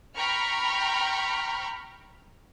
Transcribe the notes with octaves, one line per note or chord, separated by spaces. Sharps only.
G5 A#5 B5 C#6 F6